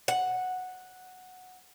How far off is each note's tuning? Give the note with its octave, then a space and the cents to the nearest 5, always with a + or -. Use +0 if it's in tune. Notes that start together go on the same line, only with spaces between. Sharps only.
F#5 -5